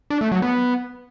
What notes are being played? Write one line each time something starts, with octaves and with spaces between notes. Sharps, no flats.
D4
A3
F#3
B3